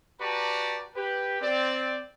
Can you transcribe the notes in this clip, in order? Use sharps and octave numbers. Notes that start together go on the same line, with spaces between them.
F#4 G4 B4 D5 A5 A#5
G4 B4
C4 D5